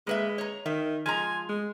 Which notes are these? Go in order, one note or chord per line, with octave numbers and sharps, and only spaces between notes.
G#3 A#3 B4 E5
C#5 A#5
D#3 E5
F3 G#3 G#5 A#5
G#3